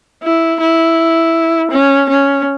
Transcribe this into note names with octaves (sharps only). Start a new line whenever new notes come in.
E4
E4
C#4
C#4